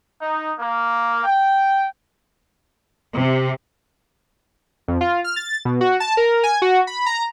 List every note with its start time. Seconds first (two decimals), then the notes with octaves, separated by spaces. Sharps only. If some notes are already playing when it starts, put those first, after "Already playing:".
0.20 D#4
0.59 A#3
1.24 G5
3.17 C3
4.88 F2
5.01 F4
5.24 F6
5.36 A6
5.65 B2
5.81 F#4
6.00 A5
6.17 A#4
6.43 G#5
6.62 F#4
6.87 B5
7.06 A#5